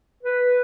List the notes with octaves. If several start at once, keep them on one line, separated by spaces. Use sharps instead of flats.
B4